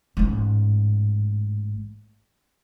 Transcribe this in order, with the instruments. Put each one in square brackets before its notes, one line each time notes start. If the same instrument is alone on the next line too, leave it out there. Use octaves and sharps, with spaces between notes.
[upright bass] A1 G#2